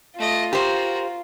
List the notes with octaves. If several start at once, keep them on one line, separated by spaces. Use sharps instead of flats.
A3 F4 D#5
F#4 G4 A#4 C5